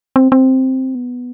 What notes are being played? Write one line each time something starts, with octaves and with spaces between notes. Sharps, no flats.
C4
C4
B3